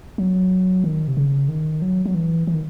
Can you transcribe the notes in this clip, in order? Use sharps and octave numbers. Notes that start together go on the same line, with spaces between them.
F#3
D#3
C3
C#3
D#3
F#3
F#3
E3
E3
D#3